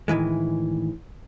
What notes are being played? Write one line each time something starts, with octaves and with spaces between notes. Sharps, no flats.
A2 D#3 E3 G#3